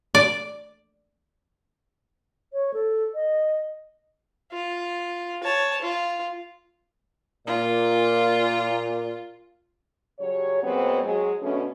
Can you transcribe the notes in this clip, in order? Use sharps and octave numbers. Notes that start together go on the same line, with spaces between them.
D5
C#5
A4
D#5
F4
C#5 A5
F4
A#2 F4
C#3 F#3 G3 C#5
A#2 F#3 G#3 B3 C4
F#3 G#3
B2 D3 A3 C#4